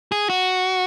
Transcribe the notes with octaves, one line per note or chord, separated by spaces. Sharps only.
G#4
F#4